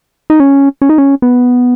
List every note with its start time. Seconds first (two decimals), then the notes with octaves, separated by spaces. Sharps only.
0.30 D#4
0.40 C#4
0.82 C#4
0.89 D#4
0.98 C#4
1.22 B3